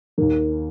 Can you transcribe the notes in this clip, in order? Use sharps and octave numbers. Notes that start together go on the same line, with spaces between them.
D#2 D#3 A#3